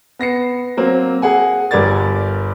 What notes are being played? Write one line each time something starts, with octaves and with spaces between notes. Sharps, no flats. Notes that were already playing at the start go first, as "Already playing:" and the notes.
B3 A#6 C7 C#7
F#3 A#3 C4
G#4 F#5 G#5
G1 G3 A#4 D5 G#6 A6